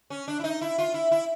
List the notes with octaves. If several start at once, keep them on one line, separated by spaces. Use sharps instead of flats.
C#4
D4
E4
D#4
E4
F4
E4
E4